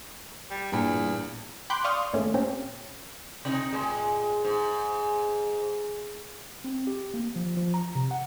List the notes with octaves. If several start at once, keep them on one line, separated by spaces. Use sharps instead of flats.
G3
E2 G2 A#2
G5 B5 C6 D6 F#6 G6
D5 F5 C6 C#6 D#6 F6
F2 G#2 D#3 A3 A#3 C#4
A#2 A#3 C4 C#4 G4
C3 D#4
A2 G#3
G#2
C4
G4
A#3
F3
F3
A#5
C3
F#5